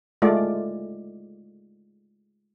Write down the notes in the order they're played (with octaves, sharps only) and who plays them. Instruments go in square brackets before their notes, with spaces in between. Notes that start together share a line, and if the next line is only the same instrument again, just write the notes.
[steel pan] G#3 A3 F4 D5